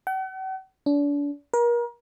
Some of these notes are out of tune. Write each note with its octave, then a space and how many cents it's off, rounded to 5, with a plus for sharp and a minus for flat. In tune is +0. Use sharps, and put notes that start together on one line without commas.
F#5 +45
D4 -35
A#4 +35